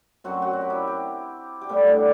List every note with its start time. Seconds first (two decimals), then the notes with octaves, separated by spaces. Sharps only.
0.24 F#2 F#3 C4 F#4
0.42 F#4
0.53 F#4
0.61 G4
0.70 E4
0.87 G4
1.61 G4
1.69 A2 G3 B3 A4
1.87 D4